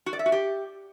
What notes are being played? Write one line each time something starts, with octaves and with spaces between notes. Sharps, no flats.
F#4
D5
E5
F#4
G4